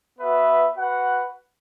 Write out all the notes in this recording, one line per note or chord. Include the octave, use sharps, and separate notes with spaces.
B3 F#4 B4 E5
F#4 B4 F#5